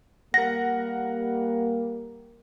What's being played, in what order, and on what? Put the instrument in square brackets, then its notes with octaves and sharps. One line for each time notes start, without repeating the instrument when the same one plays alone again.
[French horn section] G3 A#3 [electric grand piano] A#4 F#5 [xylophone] A#6